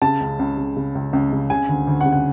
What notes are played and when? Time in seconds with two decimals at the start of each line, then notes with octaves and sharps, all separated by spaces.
0.02 C#3 A5
0.21 C#2
0.39 C#2
0.58 C#3
0.77 C#3
0.95 C#2
1.13 C#2
1.32 C#3
1.50 C#3 G#5
1.69 D2
1.87 D2
2.01 F#5
2.06 C#3
2.12 F#5